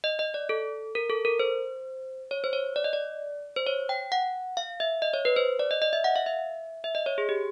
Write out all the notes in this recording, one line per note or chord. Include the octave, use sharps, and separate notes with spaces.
D#5
D#5
D5
A4
A#4
A4
A#4
C5
C#5
C5
C#5
D5
D#5
D5
C5
C#5
G5
F#5
F5
E5
D#5
C#5
B4
C5
D5
D#5
D#5
E5
F#5
F5
E5
E5
D#5
C#5
G#4
G4